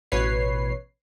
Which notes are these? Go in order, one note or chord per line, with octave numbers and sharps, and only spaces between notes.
A1 B2 B4 C#5 C7